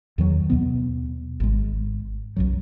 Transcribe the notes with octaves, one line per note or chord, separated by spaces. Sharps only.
E2 D#3 F#3
D#2 B2 B3
G#1 G#3
B1 F#2 F#3